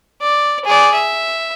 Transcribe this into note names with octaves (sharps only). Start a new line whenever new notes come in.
D5
G#4 D5
E5